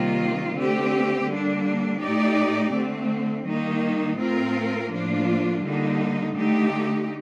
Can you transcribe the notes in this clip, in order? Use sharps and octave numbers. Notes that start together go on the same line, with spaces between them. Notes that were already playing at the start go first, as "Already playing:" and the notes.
Already playing: C3 D#3 G3 A#3 F4
D3 A3 C4 G4
D3 G3 A#3 D4
A2 A3 D#4 G4 D5
D3 A3 C4
D#3 G3 A#3 D#4
A2 A3 C4 F4 A#4
A2 F3 A#3 D4 F4
D3 G3 A#3 D#4
D3 A3 D#4 G4